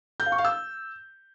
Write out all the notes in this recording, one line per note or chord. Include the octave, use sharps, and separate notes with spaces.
G6
F5
C#6
F5
E6